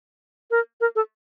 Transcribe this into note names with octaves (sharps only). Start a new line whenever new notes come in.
A#4
A#4
A4